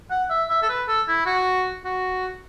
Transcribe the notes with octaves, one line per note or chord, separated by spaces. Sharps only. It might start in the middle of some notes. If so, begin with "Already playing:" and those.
F#5
E5
E5
A4
B4
A4
E4
F#4
F#4